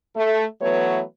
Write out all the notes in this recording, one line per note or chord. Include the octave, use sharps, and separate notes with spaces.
A3
E3 F#3 A3 B3 B4 C#5